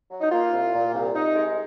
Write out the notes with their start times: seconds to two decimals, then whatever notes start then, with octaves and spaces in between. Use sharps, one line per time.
0.11 F#3
0.21 D#4
0.31 A#3 F4
0.52 C2
0.74 A#2
0.94 C2
1.14 C2 D#4
1.35 G#3